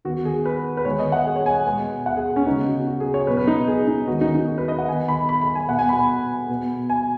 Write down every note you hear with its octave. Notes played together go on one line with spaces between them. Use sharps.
D#3 B3 F#4
G#4
B4
B4
D#3 G#3 B3 C#5
D#5
F#5
G#4
C#5
G#5
B2 G#3 B3
F#5
G#4
C#4
C#3 G#3 B3 D#4
F#4
F#4
G#4
C#5
B2 F#3 B3 B4
B4
D#4
G#4
D#4
D#3 G#3 B3 F#4
D#4
D#4
F#4
B4
D#5
F#5
D#3 B3 G#5
B5
B5
B5
G#5
B2 B3 F#5
G#5
B5
B5
B2 B3
G#5